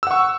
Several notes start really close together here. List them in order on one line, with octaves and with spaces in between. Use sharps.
E6 F#5 C#6